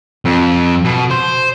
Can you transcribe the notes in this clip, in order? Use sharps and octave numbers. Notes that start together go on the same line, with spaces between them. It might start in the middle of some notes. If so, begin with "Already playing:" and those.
F2
B2
C5